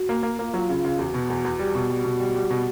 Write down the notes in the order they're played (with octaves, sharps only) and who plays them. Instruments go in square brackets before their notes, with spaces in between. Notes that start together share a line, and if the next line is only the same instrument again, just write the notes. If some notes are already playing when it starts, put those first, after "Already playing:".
Already playing: [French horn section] F#4
[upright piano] A#3
A#3
[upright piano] A#3 [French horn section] F4
[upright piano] F#3
C#3
C#3
[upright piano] E2 [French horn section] F#4
[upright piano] B2
E2
E2
G3
B2
G3
B2
G3
G3
B2